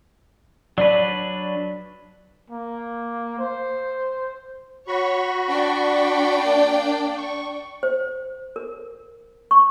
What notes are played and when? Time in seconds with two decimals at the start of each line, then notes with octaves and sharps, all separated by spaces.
0.78 F#3 D4 B4 D5
2.50 A#3
3.39 C5
4.88 F#4 C#5 B5 C#6
5.49 D4 D5 G5
6.44 A#3
7.18 C#6
7.83 C5
8.56 A#4
9.51 C#6